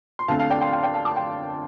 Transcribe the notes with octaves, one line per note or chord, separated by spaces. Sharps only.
C6
D2 D3 A3 C4 F5 A5
F5 A5
D5 G5
G5 C6
G5 C6
D5 G5
F5 A5
A5 D6
G5 C6